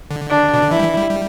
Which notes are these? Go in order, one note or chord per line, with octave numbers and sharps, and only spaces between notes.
D3
D4
B2
D3
E3 E4
G3
E3
G3
G3